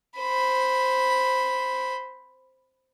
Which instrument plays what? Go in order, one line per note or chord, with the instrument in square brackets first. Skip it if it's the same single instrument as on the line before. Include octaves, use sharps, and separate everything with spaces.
[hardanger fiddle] C5 B5